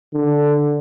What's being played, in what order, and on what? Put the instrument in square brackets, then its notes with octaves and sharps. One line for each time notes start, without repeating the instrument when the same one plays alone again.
[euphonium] D3